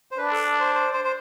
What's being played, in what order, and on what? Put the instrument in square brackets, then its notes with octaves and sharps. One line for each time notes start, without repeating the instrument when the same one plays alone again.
[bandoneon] C5
[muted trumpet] D4 [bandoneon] B4
[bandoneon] A4
C5
C5
C5
C5